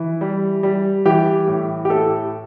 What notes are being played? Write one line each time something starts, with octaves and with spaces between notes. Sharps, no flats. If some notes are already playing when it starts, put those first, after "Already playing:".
Already playing: E3
G3
G3
E3 G4
A2
G4
A2 A4